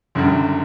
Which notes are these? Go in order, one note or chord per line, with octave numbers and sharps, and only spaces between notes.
F#1 F#2 D3 G3